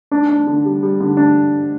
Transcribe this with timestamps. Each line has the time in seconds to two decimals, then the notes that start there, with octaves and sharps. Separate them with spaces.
0.11 D4
0.29 D4
0.47 D3
0.65 G3
0.83 G3
1.00 D3
1.17 D4